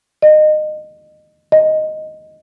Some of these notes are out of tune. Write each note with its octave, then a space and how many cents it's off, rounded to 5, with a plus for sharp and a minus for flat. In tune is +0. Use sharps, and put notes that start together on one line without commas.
D#5 -25
D#5 +0